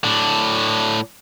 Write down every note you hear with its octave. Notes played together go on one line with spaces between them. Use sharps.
A2 D4